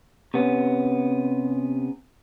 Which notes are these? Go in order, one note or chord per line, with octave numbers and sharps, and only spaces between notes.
C3 B3 C#4